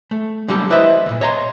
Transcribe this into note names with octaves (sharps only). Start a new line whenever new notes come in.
A3
D3 F#3 G3 A#3 G4 A4
E4 B4 C5 D#5 E5
D#2 A#2
C#5 D#5 A#5 C6